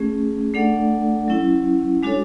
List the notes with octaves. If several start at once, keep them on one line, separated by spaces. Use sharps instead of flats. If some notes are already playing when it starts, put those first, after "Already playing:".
Already playing: A3 C#4 G#4
A3 D4 A4 D5 F#5
F#3 C#4 E4
G#3 D4 F#4 A4 C#5